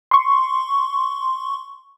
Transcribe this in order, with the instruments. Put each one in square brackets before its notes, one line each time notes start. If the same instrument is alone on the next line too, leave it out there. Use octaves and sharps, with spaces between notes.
[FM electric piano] C6 C#6